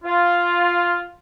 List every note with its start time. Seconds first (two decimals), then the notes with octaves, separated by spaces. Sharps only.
0.04 F4